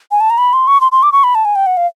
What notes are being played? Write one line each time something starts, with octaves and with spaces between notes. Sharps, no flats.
G#5
A5
A#5
B5
C6
C#6
C6
C6
D6
C#6
B5
A5
G#5
G5
F#5
F5